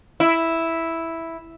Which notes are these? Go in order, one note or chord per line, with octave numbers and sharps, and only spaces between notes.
E4